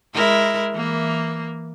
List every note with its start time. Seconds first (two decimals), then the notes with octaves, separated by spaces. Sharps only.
0.14 G#3 E4 A#4
0.72 E3 A#3